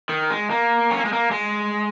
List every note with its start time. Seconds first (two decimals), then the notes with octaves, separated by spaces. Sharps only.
0.09 D#3
0.30 G#3
0.50 A#3
0.91 C#4
0.97 A#3
1.05 G#3
1.13 A#3
1.31 G#3